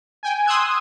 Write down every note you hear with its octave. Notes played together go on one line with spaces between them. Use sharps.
G5 G#5
C6 D#6 E6 F#6 G#6